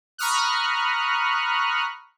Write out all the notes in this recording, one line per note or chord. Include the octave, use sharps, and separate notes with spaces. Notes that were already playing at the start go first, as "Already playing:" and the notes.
A#5 B5 C#6 D#6 F6 F#6